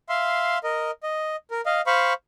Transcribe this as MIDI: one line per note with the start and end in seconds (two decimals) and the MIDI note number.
0.09 0.58 76
0.09 0.58 77
0.09 0.58 84
0.64 0.91 70
0.64 0.91 75
1.03 1.36 75
1.51 1.61 70
1.66 1.81 75
1.66 1.81 77
1.87 2.13 72
1.87 2.13 77
1.87 2.13 83
1.87 2.13 85